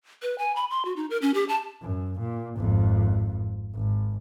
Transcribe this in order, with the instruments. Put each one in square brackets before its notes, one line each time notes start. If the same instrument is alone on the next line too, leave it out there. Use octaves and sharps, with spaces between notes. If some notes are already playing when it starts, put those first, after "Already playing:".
[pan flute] B4
G#5
B5
C6
F#4
D#4
A#4
C#4
G4
A5
[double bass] F#2
A#2
G#1 F2
G#1